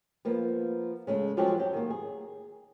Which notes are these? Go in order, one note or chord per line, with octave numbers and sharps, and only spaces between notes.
F3 A#3 B3
C#3 G#3 A3
F3 F#3 G#3 F#4 G4 A4
F#3 G4
D#3 A#3
G#4